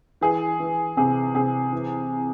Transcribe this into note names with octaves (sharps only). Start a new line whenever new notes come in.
E3 G#4
E3
C3 G#4
C3 G#4
E3